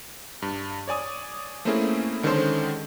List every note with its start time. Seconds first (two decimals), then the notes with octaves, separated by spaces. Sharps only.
0.42 G2
0.87 C#5 D5 G#5 D#6
1.65 A3 A#3 C4 C#4 E4 G#4
2.23 D3 D#3 G#3 C#4 A4 C5